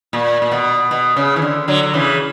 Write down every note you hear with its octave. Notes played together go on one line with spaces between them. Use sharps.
A#2
A#2
B2
B2
C#3
E3
D3
D3 F#3
F#3
C#3 E3